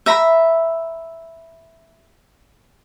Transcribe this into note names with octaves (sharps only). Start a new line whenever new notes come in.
E5 A#5 B5